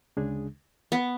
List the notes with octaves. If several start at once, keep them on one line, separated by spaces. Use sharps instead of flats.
D2 C#3 G#3 D4 G#4
B3